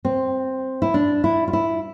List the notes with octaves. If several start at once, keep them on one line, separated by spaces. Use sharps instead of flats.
C4
E4
D4
E4
F4
E4